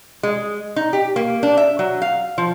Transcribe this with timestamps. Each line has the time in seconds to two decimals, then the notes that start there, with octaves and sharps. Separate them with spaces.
0.23 G#3
0.76 D#4
0.93 G4
1.16 A#3
1.43 D4
1.57 E5
1.79 F#3
2.02 F5
2.38 F3